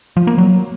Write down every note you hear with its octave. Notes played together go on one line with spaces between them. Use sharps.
F3
A#3
F#3